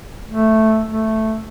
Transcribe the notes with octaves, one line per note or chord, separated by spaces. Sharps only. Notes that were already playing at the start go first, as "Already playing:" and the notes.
A3
A3